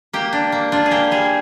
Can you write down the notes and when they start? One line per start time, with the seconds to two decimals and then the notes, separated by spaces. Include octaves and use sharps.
0.13 A#3 G4
0.33 D4
0.52 A#3
0.72 D4 F4
0.86 G#4
0.91 A#3 G4
1.11 G3 G#4